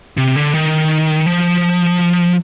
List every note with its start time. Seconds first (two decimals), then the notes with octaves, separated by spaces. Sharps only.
0.17 C3
0.36 D3
0.54 D#3
1.26 F3